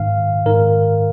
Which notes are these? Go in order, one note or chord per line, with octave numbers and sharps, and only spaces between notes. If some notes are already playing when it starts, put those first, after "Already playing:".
Already playing: G#2 D#3 F5
G#2 D#3 A#4